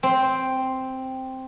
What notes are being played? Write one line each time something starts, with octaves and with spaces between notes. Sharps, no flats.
C4